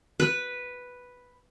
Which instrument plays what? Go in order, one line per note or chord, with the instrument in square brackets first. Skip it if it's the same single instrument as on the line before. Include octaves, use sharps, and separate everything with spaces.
[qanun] B4